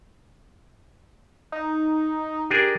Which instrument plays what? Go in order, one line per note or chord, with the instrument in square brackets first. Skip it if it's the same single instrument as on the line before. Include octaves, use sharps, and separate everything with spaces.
[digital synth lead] D#4
[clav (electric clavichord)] D4 G#4 A#4 [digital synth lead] G4